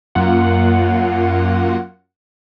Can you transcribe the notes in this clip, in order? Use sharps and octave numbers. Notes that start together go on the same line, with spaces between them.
F#2 A#3 F4 F#5